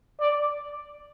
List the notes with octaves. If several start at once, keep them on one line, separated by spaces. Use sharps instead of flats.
D5